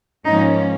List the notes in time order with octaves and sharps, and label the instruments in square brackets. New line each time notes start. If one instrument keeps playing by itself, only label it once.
[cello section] G#2 F3 A#3 C#4 D#4